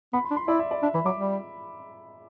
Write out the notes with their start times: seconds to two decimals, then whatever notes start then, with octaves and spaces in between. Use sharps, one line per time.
0.13 B3 B5
0.25 C6
0.31 D4
0.37 C6
0.48 E4 D5
0.59 E5
0.71 D5
0.83 D4 E5
0.94 E3 B5
1.05 F#3 D6
1.17 G3